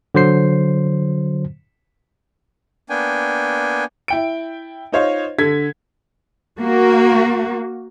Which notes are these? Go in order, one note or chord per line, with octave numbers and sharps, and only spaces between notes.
D3 F#3 C5 C7
A#3 B3 D4 G5 G#5
E4 G5 D7
D#4 F4 C5 C#5 D#5 F5
D3 A4 G#6 B6
A#3 F#4